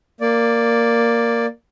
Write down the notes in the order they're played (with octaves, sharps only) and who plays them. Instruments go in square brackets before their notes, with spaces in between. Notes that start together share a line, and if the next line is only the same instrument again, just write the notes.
[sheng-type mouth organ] A#3 D5